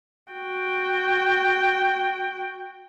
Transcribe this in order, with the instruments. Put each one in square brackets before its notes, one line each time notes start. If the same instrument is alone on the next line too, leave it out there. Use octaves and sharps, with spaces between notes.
[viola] F#4 G5